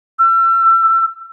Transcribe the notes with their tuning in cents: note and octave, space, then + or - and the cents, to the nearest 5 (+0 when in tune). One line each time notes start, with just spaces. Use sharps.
E6 +35